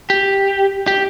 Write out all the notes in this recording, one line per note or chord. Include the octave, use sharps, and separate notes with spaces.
G4
G4